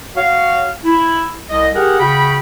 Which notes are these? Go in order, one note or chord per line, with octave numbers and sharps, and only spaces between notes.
F#4 C#5 F5
E4
C2 D#5
G4 G#4 A#4 F#5
C#3 F#4 G5 B5